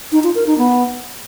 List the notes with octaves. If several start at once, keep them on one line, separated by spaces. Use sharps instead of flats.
D#4
F4
A#4
D#4
B3